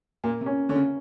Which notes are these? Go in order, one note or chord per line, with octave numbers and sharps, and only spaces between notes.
A#2 A#3
C3
C#4
D3 C#4
C#3